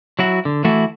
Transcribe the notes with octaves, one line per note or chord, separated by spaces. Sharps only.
F#3 E4 F#4
D3
E3 A3 E4 F#4